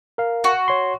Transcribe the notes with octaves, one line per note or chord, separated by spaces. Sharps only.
A#4 F5
F#4
C#5 C6